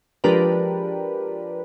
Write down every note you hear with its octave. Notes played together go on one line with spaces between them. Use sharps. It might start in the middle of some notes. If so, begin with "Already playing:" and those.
F3 G#3 D4 G4 A#4 B4